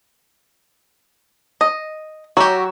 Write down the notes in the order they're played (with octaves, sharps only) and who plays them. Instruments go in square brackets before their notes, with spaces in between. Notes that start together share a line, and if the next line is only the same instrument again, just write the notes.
[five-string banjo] D#5
[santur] F#3 C#6 E6 [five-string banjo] F#4 G4